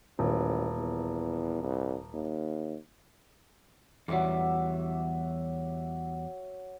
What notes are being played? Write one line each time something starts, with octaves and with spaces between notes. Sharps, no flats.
D#1 A1
E2
C2
D#2
E2 F#3 G3 E5 D6